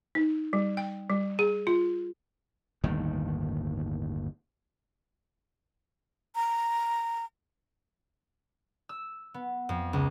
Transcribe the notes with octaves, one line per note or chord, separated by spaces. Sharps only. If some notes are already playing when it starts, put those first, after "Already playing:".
D#4
G3
G5
G3
G#4
F4
G1 D#2 A2 D#3
A#5
E6
B3
F2
C#2